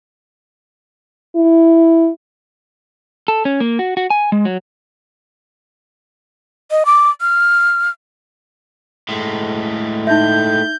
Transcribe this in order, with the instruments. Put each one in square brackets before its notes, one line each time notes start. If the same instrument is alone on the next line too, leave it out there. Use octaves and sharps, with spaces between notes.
[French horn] E4
[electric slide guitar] A4
C#4
A#3
F#4
F#4
G#5
G#3
F#3
[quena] D#5
D6
F6
[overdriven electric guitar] A2 G#3
[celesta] D#4 E5 [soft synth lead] G6